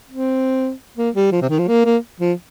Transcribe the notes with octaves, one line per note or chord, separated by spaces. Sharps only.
C4
A#3
G3
F3
C3
D#3
F3
A#3
A#3
F3